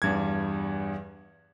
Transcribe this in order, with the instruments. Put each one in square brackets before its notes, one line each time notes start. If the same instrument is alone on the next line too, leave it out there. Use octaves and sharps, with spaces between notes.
[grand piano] E2 G2 G#6